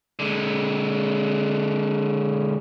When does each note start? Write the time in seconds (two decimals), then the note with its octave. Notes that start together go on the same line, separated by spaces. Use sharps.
0.19 D3 G#3